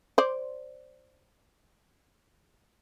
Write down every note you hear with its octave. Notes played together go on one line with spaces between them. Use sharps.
C5 D5